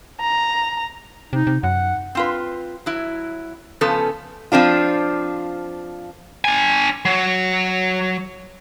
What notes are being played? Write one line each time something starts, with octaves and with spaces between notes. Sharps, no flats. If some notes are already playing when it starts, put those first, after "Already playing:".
A#5
C3 D#4
C3
F#2 F#5
C4 F4 B4
F#3 E4
C#3 F3 B3 C#4 A4
F3 C4 D4 F4
D4 G#5
F#3